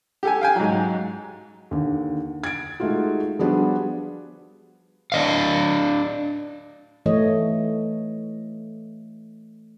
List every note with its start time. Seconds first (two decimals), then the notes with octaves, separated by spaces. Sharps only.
0.23 G4 A4 G#5
0.41 F5 G5 G#5
0.56 G#2 F#3
1.71 D#2 D3
2.44 G#6 A6 D7
2.80 G#3 A3 D#4 F4 F#4
3.39 F3 G3 B3 D4 F#4 G#4
5.12 D4 D#5 F5
7.06 E3 A3 C#5 D#5